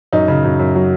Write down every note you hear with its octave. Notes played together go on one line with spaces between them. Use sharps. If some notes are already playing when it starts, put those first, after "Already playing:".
F#2 D#4
C#3
F#2
F#2
F#3